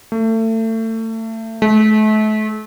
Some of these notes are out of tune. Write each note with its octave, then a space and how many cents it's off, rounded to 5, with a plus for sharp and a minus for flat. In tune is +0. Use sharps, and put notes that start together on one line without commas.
A3 +30
A3 -35